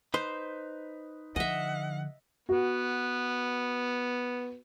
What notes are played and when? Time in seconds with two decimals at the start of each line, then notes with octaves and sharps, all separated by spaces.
0.14 D#4 B4 C5 C6
1.36 D3 F3 D#5 E5 F#5
2.49 B3 F#4